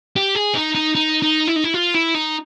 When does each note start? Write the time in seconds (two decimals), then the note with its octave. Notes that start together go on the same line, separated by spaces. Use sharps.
0.16 G4
0.35 G#4
0.55 D#4
0.75 D#4
0.95 D#4
1.22 D#4
1.48 E4
1.56 D#4
1.64 E4
1.74 F4
1.95 E4
2.14 D#4